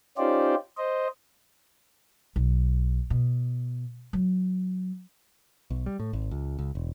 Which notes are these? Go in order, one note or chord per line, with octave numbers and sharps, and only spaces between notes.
C#4 D#4 F4 G4 C5 D5
C5 D#5
B1
B2
F#3
B1
G3
A2
G#1
C#2
C#2
E1